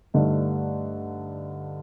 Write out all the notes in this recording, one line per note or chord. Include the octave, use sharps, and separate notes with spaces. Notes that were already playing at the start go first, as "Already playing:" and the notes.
G2 D3 A3 D#4